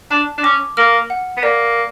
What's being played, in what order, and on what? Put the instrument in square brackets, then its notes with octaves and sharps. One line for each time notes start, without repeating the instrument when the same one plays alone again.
[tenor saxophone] D4 [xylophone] A5
[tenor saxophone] D4
[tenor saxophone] C#4 [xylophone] D6
[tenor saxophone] A#3 [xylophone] F6
[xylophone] F#5
[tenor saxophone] B3
[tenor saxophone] A#3 [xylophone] D5